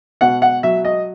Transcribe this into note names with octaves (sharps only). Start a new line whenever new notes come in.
B2 F#5
F#5
F#3 E5
D#5